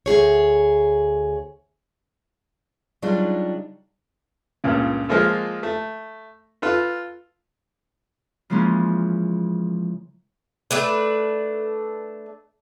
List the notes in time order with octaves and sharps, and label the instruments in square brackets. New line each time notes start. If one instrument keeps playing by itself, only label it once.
[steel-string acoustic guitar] D2 G#2 G#4 C#5
C#3 F#3 G3 D4 D#4 F4
[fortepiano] C#2 G2 A#2 C#3
F3 G#3 A#3 F4 A4
A3
F4 A4 B4
[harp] C#3 E3 F3 G#3 A#3 C#4
[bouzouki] A3 D4 B4